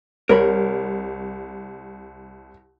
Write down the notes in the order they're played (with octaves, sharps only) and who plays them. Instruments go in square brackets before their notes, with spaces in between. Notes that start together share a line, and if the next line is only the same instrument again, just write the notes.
[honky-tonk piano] C2 [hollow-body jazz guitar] A#4 C#5 B5